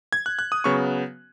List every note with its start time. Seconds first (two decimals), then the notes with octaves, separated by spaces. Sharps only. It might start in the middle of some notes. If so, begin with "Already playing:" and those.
0.13 G#6
0.26 F#6
0.39 F#6
0.52 D#6
0.64 C#3 F#3 B3 C#6